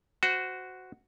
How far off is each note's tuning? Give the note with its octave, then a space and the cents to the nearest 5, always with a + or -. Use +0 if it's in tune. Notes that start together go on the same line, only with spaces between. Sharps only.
F#4 +0 C5 -20